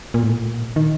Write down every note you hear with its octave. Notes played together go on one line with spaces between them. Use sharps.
A#2
A2
A#2
D#3